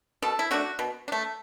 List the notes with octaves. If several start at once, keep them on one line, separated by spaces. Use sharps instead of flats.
B2 A4
E4
A3 D4 F#4
B2
D4
A3